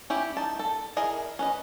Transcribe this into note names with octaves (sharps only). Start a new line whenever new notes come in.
C#4 E4 G4
D#4 A5
A4
E4 G#4 A#4 D#5
C#4 B4 D#5